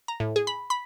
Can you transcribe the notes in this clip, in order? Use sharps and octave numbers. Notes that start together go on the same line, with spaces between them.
A#5
A2
G#4
B5
B5